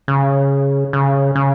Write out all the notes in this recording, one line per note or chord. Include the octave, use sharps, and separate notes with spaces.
C#3
C#3
C#3